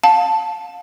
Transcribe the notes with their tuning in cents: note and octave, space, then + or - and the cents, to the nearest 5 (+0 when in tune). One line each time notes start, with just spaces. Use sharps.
F5 +30 A5 +0